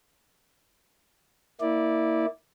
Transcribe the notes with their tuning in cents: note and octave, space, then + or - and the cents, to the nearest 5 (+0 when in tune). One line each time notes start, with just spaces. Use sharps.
A#3 +0 E4 -20 D5 +0